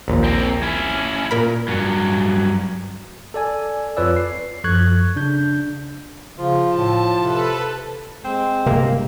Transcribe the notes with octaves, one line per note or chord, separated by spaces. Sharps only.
A#1 D#2
C4 A#4
C#4 E4
A#2 A#4 B5
G2 F#3
A4 D5 G#5
F2 F4 B4 C#5 D5 E6
C7
F#2 F3 A4 C#6 F#6 G#6
C#3 D4 G6
C#3 F3 F4
A2 A5
C3 A4 B4
G#3 C4
G1 C3 A#3